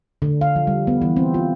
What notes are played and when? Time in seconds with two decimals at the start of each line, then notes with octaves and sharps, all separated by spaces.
0.22 D3
0.41 F5
0.56 F3
0.67 G3
0.87 B3
1.02 E3
1.16 C4
1.34 F4